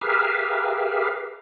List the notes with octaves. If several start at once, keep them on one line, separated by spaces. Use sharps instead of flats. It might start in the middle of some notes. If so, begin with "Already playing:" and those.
G4 G#4 A#4 B4 E5 F5